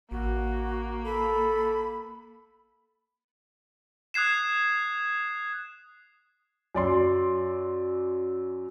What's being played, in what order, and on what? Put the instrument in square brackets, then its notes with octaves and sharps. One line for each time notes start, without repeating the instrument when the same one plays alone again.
[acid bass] A1 [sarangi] A#3 [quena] F#4
[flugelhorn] A4 [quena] B5
[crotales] D#6 F#6 G#6 C7 E7
[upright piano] F#2 D5 C6